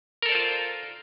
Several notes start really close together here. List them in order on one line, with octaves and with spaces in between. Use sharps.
A#4 A4 D5 C5 F4